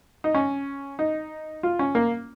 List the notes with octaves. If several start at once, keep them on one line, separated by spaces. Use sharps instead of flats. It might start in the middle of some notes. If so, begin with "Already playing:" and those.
D#4
C#4
D#4
F4
C#4
A#3